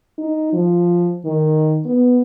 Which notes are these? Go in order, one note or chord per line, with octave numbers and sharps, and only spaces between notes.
D#4
F3
D#3
B3